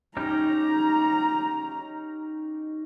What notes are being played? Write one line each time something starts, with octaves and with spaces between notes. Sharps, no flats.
C#4 D#4 G4 A#5